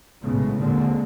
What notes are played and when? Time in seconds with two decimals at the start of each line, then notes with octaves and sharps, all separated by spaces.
0.21 B1 A2 C#3 G#3 B3
0.57 D#2 A#2 D3 G#3 C4